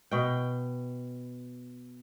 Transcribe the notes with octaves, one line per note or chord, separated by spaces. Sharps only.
B2 G5